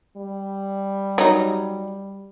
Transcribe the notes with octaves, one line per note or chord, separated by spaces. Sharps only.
G3
F#3 D#4